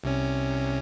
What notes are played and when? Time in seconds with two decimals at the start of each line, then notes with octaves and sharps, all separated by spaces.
0.04 C2 C3 C#4